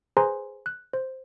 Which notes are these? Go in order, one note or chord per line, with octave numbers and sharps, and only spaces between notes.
G#4 B4 C5 G#5 A#5 C6
F#6
C5